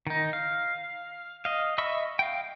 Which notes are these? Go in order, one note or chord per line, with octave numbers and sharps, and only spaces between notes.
D#3 D#4
F5
D#5 F5
D#5 E5 B5 C#6 E6
F5 G5